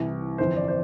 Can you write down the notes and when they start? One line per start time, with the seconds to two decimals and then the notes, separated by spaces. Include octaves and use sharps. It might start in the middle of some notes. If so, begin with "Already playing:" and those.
Already playing: C2 C3 E3
0.38 G1 F2 E3 C5
0.57 D5
0.68 C5